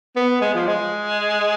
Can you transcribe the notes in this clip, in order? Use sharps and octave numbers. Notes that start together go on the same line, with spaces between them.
B3
G#3
F3
G#3